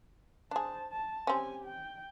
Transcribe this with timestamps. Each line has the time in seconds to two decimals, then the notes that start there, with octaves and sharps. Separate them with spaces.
0.51 D4 G#4 C5 A5
0.92 A5
1.27 C4 C#4 G4 G#5
1.65 G5